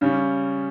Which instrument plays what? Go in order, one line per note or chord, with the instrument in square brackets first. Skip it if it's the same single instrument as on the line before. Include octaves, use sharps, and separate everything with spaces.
[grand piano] C#3 G3 C#4